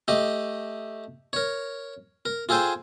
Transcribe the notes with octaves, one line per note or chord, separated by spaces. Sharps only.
A3 G4 D#5
A#4 C#5
A#4
F4 G#4 A4 C5 G5 G#5